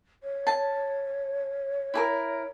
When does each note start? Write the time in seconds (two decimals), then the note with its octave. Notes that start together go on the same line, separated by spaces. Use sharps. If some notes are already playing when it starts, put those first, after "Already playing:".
0.23 C#5
0.47 A5
1.94 E4 G4 A#4